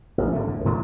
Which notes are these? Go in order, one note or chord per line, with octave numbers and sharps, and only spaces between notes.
A1
G#1 D3 A3
E2
A2 D#3 E3 A3